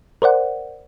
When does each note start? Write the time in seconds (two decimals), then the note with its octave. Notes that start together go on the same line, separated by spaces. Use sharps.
0.22 A#4 C5 D5 F#5